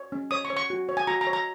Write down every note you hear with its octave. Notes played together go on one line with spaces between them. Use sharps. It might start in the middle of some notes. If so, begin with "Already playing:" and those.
Already playing: C#5
C#4
C#5 D#6
C#6
C#5
C#6
F#4
C#5
G#5
F#4 A#5
A#5
C#5
A#5